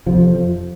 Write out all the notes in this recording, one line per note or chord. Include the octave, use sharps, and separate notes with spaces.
F2 C3 F3
F3